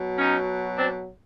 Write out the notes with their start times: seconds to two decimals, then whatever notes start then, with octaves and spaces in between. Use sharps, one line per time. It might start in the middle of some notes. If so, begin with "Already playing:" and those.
Already playing: B2 F#3
0.19 C#4 D#4
0.78 C4 D4